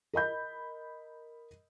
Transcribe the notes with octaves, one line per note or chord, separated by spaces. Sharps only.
A#4 D#5 B5 G6